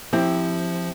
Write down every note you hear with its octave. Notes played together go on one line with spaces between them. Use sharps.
F3 C4 E4 G4